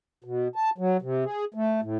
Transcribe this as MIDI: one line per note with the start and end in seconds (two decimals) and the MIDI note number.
0.24 0.48 47
0.55 0.70 81
0.78 0.97 54
1.02 1.24 48
1.25 1.45 68
1.54 1.81 57
1.83 1.98 45